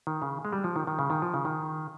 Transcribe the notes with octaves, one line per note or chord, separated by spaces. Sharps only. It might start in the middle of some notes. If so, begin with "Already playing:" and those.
D#3
C#3
G#3
G3
F3
D#3
D#3
C#3
D#3
F3
C#3
D#3